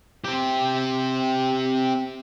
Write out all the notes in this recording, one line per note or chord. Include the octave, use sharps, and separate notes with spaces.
C4 G4